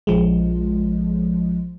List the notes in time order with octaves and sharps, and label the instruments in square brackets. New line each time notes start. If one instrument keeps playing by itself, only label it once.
[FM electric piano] A#1 F3 G#3